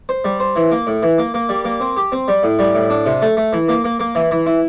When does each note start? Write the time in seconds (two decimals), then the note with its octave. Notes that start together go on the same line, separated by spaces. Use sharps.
0.09 C5
0.24 G3
0.40 C5
0.56 E3
0.71 A#3
0.87 A2
1.03 E3
1.18 A#3
1.34 A#3
1.49 G3
1.65 A#3
1.81 C4
1.97 G4
2.12 C4
2.28 G3
2.43 A2
2.59 G3
2.75 A2
2.90 D4
3.06 C3
3.22 A3
3.37 A3
3.53 E3
3.68 A#3
3.84 A#3
4.00 A#3
4.15 E3
4.31 E3
4.46 E4